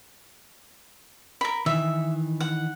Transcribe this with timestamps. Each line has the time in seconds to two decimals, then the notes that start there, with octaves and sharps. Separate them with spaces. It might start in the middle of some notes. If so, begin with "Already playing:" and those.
1.41 A#4 B5
1.66 D#3 E3 E5
2.40 F#5